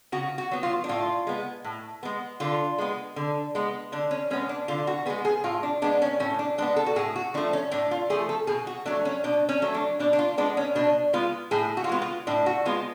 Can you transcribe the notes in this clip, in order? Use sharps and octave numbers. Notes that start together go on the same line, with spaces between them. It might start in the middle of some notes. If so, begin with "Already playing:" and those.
C#3 F#4
F#4
F#3 B3
F4
D4
A2 F4
G#3 B3
A2
G#3 B3
D3 F4
G#3 B3
D3
G#3 B3
D3 D4
C#4
G#3 B3 C#4
D4
D3 F4
F#4
G#3 B3 G#4
G#4
A2 F4
D4
G#3 B3 D4
C#4
A2 C#4
D4
G#3 B3 D4
A4
F#4
A2 G#4
F#4
F3 A3 D4
C#4
A2 D4
F4
F3 A3 G#4
A4
B2 G#4
F#4
F#3 A3 D4
C#4
B2 D4
C#4
F#3 A3
D4
B2 D4
D4
F4
G#3 B3 D4
C#4
B2 D4
G#3 B3 F4
A2 G#4
F#4
F4
G#3 B3 F#4
F4
A2 D4
F#4
G#3 B3 F4